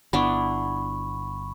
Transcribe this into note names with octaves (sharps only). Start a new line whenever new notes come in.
G1 B3 D4 E4 B5 C#6